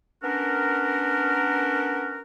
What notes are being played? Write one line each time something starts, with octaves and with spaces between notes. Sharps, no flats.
B3 C#4 D4 F#4 A#4